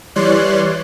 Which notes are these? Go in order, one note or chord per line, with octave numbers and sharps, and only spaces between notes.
E3 G3 C#5 D5 C6 F#6